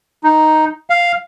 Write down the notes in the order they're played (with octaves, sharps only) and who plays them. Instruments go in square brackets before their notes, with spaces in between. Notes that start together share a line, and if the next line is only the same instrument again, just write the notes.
[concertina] D#4
F5